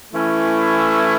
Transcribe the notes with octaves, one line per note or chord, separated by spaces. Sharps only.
E3 A3 C#4 E4